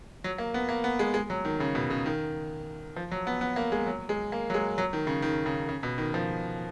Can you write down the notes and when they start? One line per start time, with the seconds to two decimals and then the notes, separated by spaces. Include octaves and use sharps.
0.24 F#3
0.38 A#3
0.54 B3
0.69 A#3
0.84 B3
0.99 G#3
1.14 G#3
1.30 F#3
1.45 D#3
1.60 C#3
1.75 B2
1.90 C#3
2.06 D#3
2.96 F3
3.11 F#3
3.27 B3
3.41 B3
3.56 A#3
3.72 G#3
3.86 F#3
4.09 G#3
4.32 A#3
4.50 F#3
4.54 G#3
4.78 F#3
4.93 D#3
5.07 C#3
5.22 D#3
5.46 C#3
5.69 C#3
5.83 B2
5.98 D#3
6.14 F3